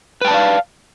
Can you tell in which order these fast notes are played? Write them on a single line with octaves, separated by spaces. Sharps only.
B4 G5 A5 D5 F5